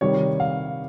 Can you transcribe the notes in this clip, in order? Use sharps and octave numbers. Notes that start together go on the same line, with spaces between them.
C3 D#3 G3 C#5
F5